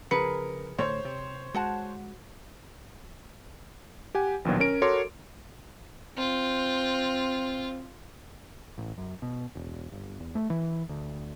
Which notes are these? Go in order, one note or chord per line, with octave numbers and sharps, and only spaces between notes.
C#3 F3 G#4 A#4 B4 C#7
A2 D3 C5 C#5
C3
G#3 F#4 F#5 A5
G4 F#5 G#5
A#1 D#2 B2 F#3
C#4 A#4 D7
F#4 A4 A#4 C#5 C6 D6
C4 F4
A1
F#2
B2
E1
G1
E2
A3
E3
D2